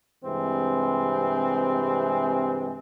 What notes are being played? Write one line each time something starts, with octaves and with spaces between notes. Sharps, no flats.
G2 C3 E3 G#3 C4